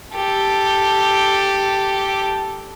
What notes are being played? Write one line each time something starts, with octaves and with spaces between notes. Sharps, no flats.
G4 A4